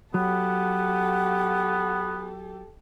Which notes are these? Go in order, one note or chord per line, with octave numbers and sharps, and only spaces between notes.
F#3 B3 G4 A4 F#5